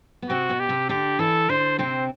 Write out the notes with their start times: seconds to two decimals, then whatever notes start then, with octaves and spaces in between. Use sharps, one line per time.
0.22 B3
0.30 C3 C4 F#4
0.49 B2 B3
0.60 G4
0.69 C3 C4
0.89 D3 D4 G4
1.19 E3 E4 A4
1.49 D3 D4 C5
1.79 C3 C4 C5